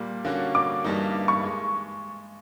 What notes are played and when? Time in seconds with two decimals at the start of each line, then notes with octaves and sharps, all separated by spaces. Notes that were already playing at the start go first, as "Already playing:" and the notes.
Already playing: A#2 G3 A#3
0.25 D3 G3 A#3 C#4 F#4
0.55 D6
0.84 G2 E3 G3 A#3 D#4
1.28 C#6
1.43 G#3